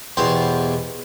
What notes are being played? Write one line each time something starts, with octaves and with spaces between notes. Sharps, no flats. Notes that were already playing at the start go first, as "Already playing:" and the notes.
E2 B2 G4 C5 C6